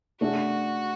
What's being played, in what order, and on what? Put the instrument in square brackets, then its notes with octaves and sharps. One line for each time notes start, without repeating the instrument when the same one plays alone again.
[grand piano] A3 D4 G#4 [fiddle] F#4